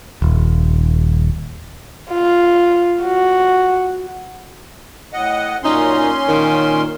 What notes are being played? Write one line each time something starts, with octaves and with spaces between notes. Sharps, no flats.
D#1
F4
F#4
A2 D#5 F#5
F#2 A#2 C#4 D#4 C6
A#2 D#3